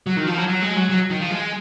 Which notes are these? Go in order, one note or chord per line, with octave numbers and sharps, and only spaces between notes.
F#3
D#3
F3
F#3
F#3
G#3
F#3
F#3
D#3
F3
G#3